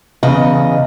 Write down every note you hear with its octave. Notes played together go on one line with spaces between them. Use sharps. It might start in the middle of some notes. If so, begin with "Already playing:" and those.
E2 C#3 D#5